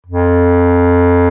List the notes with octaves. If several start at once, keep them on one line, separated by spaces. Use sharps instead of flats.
F2